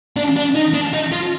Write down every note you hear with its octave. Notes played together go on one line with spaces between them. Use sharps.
D4
D4
D#4
D4
D#4
F4